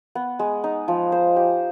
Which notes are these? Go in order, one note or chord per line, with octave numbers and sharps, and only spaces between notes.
B3
G#3
D#4
F3
C5
G4